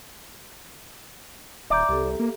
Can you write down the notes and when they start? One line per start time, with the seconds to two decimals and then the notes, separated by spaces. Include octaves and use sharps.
1.70 D#1 D5 E5 A#5 G6
1.89 C2 G4 A4
2.20 A#3